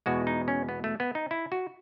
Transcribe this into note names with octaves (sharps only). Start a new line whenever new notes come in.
E2 B2 G#3 F#4
D#4
C#4
B3
A3
B3
D#4
E4
F#4